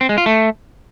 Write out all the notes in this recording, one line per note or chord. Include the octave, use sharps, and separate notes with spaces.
C4
G#3
F4
A3